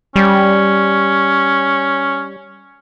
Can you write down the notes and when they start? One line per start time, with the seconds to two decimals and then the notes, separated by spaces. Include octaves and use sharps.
0.16 G3 C#4